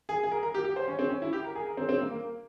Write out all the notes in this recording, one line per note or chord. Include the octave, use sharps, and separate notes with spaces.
G#4
G#4
A#4
A#4
G4
G4
C5
C#4
C4
C#4
E4
G4
A#4
G#4
A#4
C4
C4
A#3
A#3